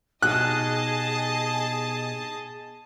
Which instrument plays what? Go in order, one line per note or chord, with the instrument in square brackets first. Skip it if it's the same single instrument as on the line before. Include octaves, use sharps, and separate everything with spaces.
[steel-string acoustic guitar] B2 D#4 G4 [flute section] G#4 [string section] D#5 A5 [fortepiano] F#6